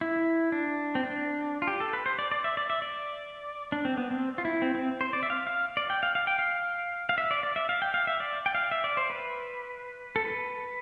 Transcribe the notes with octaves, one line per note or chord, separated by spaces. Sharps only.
E4
D4
C4
D4
F4
G4
A4
B4
C5
D5
D5
E5
D5
E5
D5
D4
C4
B3
C4
F4
E4
C4
C4
C5
D5
E5
F5
F5
D5
G5
F5
F5
G5
F5
F5
E5
D5
D5
E5
F5
G5
F5
E5
D5
G5
F5
E5
D5
C5
B4
A4
B4